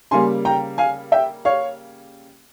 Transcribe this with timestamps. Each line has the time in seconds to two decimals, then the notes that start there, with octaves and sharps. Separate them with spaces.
0.11 C#3 G3 A#3 G#5 C6
0.45 G5 A#5
0.78 F5 G#5
1.12 E5 G5
1.45 C#5 F5